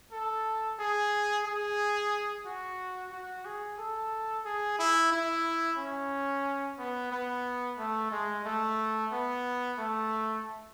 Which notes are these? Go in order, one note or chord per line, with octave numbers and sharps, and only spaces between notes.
A4
G#4
G#4
F#4
F#4
G#4
A4
G#4
E4
E4
C#4
B3
B3
A3
G#3
A3
B3
A3